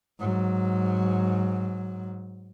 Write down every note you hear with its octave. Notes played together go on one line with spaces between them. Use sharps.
G#2 F#3